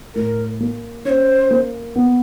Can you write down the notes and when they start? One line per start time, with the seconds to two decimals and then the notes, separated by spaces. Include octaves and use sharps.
0.15 A2 A#4
0.60 A#3
1.05 C#4 C#5
1.10 C5
1.51 A#3
1.96 B3